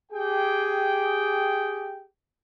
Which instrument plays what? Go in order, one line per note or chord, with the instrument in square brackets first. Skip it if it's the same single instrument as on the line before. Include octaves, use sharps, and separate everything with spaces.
[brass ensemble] G4 G#4 G5